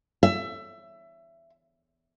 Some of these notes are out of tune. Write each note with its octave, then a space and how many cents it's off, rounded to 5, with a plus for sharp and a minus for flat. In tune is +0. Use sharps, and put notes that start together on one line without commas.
E5 +20